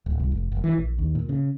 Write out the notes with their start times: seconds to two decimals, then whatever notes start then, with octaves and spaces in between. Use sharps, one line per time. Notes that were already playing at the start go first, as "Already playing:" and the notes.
0.06 D1
0.20 C2
0.32 F1
0.52 F#1
0.64 E3
0.77 A#1
0.98 D#2
1.15 A#2
1.29 C#3